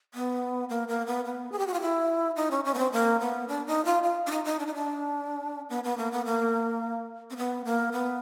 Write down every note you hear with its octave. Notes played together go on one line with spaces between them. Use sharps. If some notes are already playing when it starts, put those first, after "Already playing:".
B3
A#3
A#3
B3
B3
G#4
G4
F#4
F4
E4
D#4
C#4
C#4
B3
C4
A#3
B3
D4
D#4
F4
F4
D4
D#4
D#4
D4
D#4
D4
B3
B3
A#3
B3
A#3
C4
B3
A#3
B3